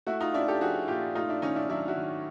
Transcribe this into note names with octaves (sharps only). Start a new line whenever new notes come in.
A3 E4 F#4
D#4 F4
C#4 D4 E4
G4 A4
F3 F#4 G#4
A#2 F4 G4
A3 D#4 F4
D4 E4
D#3 C#4 D#4
D4 E4
F#3 D4 E4
E4 F#4
D#3